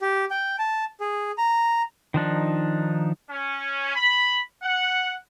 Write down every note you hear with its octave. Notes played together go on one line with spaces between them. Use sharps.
G4
G5
A5
G#4
A#5
D#3 F3 D4 D#4
C#4
B5
F#5